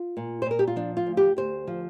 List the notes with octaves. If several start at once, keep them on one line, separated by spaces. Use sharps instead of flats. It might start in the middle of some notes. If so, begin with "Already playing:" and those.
Already playing: F4
A#2
C5
A#2 A#4
G4
F4
F3 D4
F4
D2
G4
D2 C5
F3